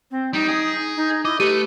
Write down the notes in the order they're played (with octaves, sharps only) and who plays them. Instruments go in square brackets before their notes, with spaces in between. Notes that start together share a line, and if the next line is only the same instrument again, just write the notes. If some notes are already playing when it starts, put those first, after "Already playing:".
[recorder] C4
[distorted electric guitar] G3 [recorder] D#4
[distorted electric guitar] G#4
[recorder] D#4
[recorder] E4 [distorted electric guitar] D#5 [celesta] D6
[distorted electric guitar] A3 [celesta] G4 D#7 [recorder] B4